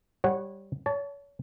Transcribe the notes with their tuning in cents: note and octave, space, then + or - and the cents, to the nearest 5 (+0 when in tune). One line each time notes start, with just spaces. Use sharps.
G3 +0 C#5 -20 F#5 +0
C#5 +35 A5 -5